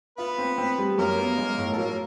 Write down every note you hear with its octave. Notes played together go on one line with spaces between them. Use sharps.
B3 F4 B4
C4
C4
G3
F#2 A#3 A#4
B3
G#3
A2
A4
F#3 A#3 A#4